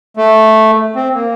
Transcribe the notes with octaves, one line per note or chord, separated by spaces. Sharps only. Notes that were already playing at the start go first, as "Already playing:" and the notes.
A3
C4
A#3